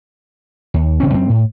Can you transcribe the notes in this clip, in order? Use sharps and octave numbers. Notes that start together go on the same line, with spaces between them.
D#2
G1 C#3 C4 C#4
F#2 C4
A2